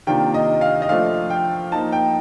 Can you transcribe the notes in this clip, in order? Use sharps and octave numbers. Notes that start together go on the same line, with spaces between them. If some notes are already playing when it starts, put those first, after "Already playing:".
C3 D#3 A#3 D4 F4 G5
D#5
F5
D#5
F3 A3 D4 F4 F5
G5
F3 A#3 D#4 A5
G5